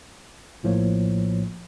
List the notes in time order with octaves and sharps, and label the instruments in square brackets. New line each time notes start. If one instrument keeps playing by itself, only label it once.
[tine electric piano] A#1 A2 F3 A#3 C#5